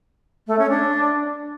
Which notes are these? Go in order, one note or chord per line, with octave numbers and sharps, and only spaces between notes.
A3
C#4
D4